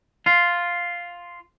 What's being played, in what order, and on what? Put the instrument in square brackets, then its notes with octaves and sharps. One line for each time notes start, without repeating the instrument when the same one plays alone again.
[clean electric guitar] F4